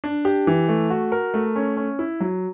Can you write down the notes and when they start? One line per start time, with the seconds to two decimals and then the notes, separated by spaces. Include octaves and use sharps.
0.04 D4
0.25 G4
0.47 E3
0.69 A3
0.90 F#4
1.12 A#4
1.34 A3
1.56 C#4
1.77 C#4
1.99 E4
2.20 F#3